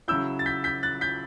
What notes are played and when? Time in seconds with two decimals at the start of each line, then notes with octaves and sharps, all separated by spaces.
0.08 C#3 F#3 C#4 E4 E6 G6
0.39 A6
0.46 G6 B6
0.64 G6 B6
0.83 F#6 A6
1.01 G6 B6